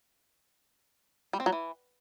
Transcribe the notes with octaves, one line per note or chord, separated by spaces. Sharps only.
G3
C4
F#3
E3